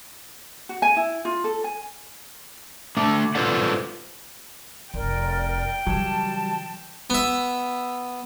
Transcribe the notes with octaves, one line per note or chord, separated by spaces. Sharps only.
F#4
G#5
E4
F4
A4
G#5
A3 D4
F4 A4 B4 C5 D5 F#5
F1 A#4 D5 G5
C#3 E3 F#3 G3 A5
B3 E5